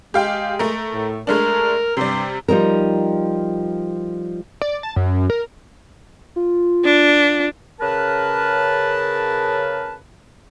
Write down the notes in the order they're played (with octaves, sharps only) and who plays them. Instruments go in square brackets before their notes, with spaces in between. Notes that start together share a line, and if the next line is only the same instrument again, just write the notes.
[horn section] G#3 [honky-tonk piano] G4 F5 G5
[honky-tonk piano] A3 A#4
[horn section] A2
[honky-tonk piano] G#3 A3 D4 [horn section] A#4
[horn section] G2 G4 C6 [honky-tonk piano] C3 G3
[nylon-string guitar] F3 G3 D#4 A#4
[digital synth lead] D5
A5
F#2
A#4
[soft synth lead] F4
[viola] D4
[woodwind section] C#3 A#4 B4 A5